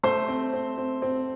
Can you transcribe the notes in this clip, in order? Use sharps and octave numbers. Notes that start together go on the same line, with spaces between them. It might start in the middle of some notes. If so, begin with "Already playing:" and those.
A3 C5 C6
C4
C4
C4
C4